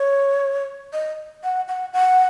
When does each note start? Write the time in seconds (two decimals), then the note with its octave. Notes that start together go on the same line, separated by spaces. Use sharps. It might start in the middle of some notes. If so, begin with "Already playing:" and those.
Already playing: C#5
0.93 D#5
1.44 F#5
1.68 F#5
1.93 F#5